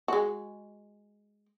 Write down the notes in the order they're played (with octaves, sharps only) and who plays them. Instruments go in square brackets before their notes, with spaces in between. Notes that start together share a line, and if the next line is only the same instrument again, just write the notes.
[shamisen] G#3 F#4